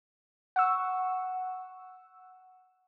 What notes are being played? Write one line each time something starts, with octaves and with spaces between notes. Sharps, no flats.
F#5 C#6 E6